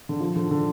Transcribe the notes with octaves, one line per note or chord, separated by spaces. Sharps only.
D3
F3
D3
D3